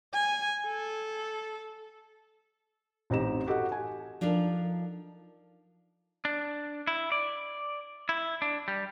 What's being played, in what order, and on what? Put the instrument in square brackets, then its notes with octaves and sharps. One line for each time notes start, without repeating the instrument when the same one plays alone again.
[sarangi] G#5
A4
[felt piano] A1 C4 D#4 G4 E7
F#4 G4 A4 D#5 F#5
G#5
[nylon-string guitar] F3 D4 D#4 A4 A#4
[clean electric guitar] D4
E4
D5
E4
D4
G3